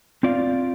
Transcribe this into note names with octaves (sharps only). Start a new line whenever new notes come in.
C4 F4 D5 F5